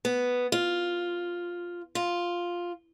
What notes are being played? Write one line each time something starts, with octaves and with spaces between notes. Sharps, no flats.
B3
F4
F4